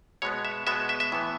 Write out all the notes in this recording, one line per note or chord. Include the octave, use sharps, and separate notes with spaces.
B2 G#3 B3 C#5
E5
B2 G#3 B3 E5
E5
E5
A2 E3 B3